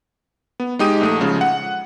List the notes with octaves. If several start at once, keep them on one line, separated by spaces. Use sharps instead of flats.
B3
G#3 D#4 G4 D#6 D#7
A#1 A3 D#6
C#3 F3 G#3
F#5